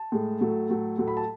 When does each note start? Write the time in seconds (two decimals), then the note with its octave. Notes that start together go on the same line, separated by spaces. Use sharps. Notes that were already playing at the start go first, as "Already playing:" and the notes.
Already playing: A5
0.12 A2 G#3
0.41 A2 F#3 A3
0.69 A2 F#3 A3
0.98 A2 F#3 A3
1.08 B5
1.17 A5